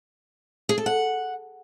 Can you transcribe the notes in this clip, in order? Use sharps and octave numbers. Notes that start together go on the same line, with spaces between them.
G#4
A4
F#5